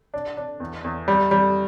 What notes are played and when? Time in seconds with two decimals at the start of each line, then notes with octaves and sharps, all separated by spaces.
0.14 D4
0.37 D4
0.60 E2
0.84 E2
1.08 G3
1.31 G3